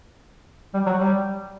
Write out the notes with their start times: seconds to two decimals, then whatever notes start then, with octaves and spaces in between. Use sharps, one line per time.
0.74 G3
0.86 F#3
0.98 G3